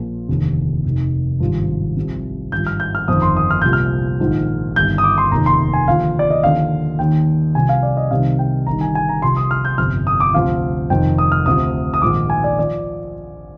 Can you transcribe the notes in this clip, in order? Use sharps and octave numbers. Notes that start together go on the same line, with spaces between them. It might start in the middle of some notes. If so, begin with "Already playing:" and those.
Already playing: A#1 A#2 F3
F1 D#2 D3
F1 D#2 D#3
G#1 G2 F3
C2 C3 F3
G#1 G2 F3 G6
F6
G6
F6
G1 F2 D#3 D#6
C6
D#6
F6
C2 A#2 F3 G6
F6
A#1 G#2 D#3
G1 G2 D#3 G6
D#6
D6
C6
F1 D#2 D#3 A#5
C6
G#5
D#2 D3 F3 F5
D5
D#5
D#2 D3 F3 F5
D#2 D#3 G5
C2 C3 F3 G#5
F5
D5
D#5
C2 C3 D#3 F5
G5
G1 G2 D#3 A#5
G#5
G#5
A#5
C2 C3 F3 C6
D#6
F6
G6
G1 F2 C3 F6
D#6
D6
D2 C3 F3 F5
F1 F2 D#3 G5
D#6
F6
D2 C3 F3 D#6
D#6
A#1 G#2 D#3 D6
G#5
D5
F3 D5